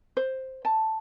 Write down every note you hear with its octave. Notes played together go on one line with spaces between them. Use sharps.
C5
A5